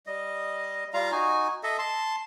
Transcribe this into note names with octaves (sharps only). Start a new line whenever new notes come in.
G3 D#5
G3 F4 F5 A#5
D#4 F#4 G#5
A4 D#5 E5
A5 C6